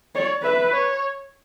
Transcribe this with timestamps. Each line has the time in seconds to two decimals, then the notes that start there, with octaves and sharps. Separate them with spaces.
0.15 C#5 D5
0.43 B4 E5
0.72 C#5